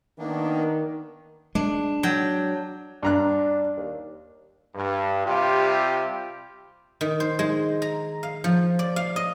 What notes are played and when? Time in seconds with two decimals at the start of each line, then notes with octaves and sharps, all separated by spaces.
0.19 D#3 A#3 B3 D4
1.55 G#3 D4
2.03 F#3 G5
3.03 G2 D4 A#5 F#6
3.77 D#2
4.74 G2
5.24 C3 G3 F4 G4
7.01 D#3
7.20 C5
7.39 G#3
7.82 A#5
8.23 F5
8.44 F3
8.79 D5
8.96 F5
9.16 D#5